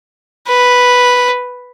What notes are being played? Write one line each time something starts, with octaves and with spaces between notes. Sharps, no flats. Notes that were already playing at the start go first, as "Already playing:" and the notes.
B4